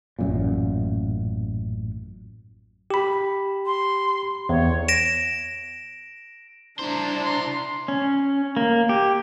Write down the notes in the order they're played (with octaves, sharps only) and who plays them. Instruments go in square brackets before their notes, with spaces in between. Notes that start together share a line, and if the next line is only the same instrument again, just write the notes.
[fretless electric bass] A1 F#2 A#2
[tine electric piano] G4 B5
[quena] C6
[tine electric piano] E2 [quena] C#5
[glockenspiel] A#6 D7 E7
[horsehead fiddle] D4 A#5 [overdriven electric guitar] E4 C5
[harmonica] C6
[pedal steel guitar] C#4
A#3
G4